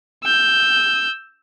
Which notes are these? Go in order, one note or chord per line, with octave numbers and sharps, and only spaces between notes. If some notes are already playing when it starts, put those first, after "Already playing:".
E6 G6